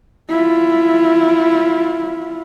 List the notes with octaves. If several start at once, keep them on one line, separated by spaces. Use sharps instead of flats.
E4 F4